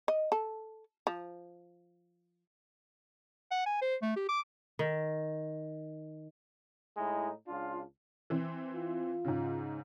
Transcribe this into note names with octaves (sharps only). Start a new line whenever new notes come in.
D#5
A4
F3
F#5
G#5
C5
A3
G4
D6
D#3
A2 G#3 D#4 E4
C#2 D4 F4
E3 C4
F4
G#2 C#3